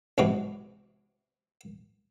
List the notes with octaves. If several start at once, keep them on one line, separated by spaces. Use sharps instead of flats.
B1 G#2 C3 E3 F#3